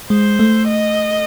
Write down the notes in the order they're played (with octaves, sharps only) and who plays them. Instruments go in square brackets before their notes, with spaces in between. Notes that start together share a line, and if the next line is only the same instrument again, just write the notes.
[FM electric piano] G#3 [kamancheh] C5
[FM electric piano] A3
[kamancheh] D#5